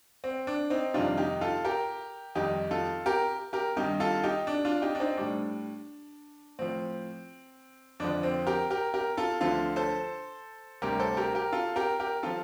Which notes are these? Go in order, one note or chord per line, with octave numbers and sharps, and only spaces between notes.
C4
D4
C4 D#4
F2 C3 D#3 G3 D4 F4
D#4 G4
F4 A4
G4 A#4
F2 D#3 G3 D#4 G4
F4 A4
G4 A#4
G4 A#4
G2 D#3 G3 D#4 G4
F4 A4
D#4 G4
D4
D4 F4
D#4 G4
D4
C4 D#4
A2 G3 D4
A2 F3 C4
F2 D3 F3 D4
C4
G4 A#4
G4 A#4
G4 A#4
F4 A4
D2 D3 F3 F4 A4
A4 C5
D2 C3 G3 G4 A#4
A4 C5
G4 A#4
G4 A#4
F4 A4
G4 A#4
G4 A#4
F3 F4 A4